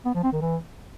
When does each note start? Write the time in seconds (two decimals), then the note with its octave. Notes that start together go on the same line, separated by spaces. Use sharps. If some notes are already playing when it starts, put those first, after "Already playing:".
0.05 B3
0.14 F3
0.23 C4
0.32 D#3
0.41 E3